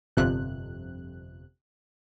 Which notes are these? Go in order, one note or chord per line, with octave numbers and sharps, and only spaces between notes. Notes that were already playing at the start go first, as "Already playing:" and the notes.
G1 F2 C3 F#6